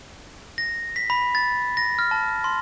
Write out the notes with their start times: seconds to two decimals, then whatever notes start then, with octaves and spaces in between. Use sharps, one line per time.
0.58 A#6
0.96 B6
1.10 B5
1.35 A6
1.77 A#6
1.99 F6
2.11 A5
2.44 C6